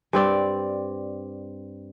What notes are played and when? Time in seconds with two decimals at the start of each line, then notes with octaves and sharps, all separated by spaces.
0.13 G2 C4 D5